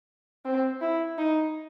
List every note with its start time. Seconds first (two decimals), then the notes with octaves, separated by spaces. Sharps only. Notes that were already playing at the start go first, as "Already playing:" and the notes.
0.45 C4
0.81 E4
1.18 D#4